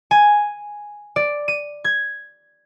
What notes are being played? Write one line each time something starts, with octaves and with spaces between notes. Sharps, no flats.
G#5
D5
D#7
G#6